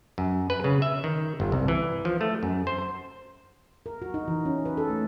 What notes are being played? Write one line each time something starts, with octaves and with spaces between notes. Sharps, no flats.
F#2
B4
C#3
E5
D#3
G1
C2
E3
F3
A3
F#2
C5
A#4
F#4
D#4
E3
C#4
B4
A4
A3